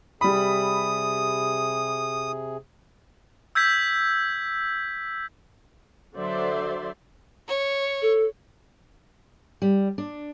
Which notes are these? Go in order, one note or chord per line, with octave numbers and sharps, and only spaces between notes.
C3 G3 G#4 B5 D#6
E6 G6 G#6 B6
D3 F#3 C5 D5 E5 C6
C#5
A4
G3
D4